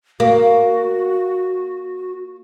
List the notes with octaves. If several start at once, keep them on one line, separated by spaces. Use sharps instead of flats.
A#3 F#4